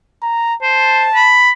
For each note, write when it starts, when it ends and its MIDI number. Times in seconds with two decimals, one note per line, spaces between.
0.22 0.54 82
0.63 1.06 72
0.63 1.42 81
1.15 1.51 83